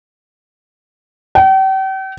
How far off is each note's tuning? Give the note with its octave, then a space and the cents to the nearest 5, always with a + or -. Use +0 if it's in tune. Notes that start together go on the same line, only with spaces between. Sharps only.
G5 -40